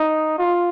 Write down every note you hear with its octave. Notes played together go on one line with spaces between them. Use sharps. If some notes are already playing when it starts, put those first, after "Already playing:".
Already playing: D#4
F4